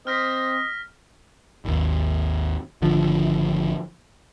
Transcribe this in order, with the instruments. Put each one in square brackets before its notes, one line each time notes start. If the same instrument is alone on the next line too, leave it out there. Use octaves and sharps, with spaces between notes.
[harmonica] C4 [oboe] D#5 [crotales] F6 A#6 B6
[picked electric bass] G#1 D#2
G#1 D3 F3